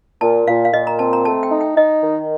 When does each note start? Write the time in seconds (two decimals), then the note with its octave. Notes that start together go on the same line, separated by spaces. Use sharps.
0.21 A#2 A5
0.48 A#2 F5
0.65 F5
0.73 A#2 D#5
0.87 A#5
0.99 C4 A5
1.13 A#5
1.25 A3 A5
1.43 G5
1.52 D#4
1.61 G5
1.77 D#4 D#5
2.03 D#3